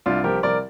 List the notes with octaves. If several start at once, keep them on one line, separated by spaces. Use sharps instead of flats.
C2 D4 F4
F3 G4 A#4
C2 A#4 D5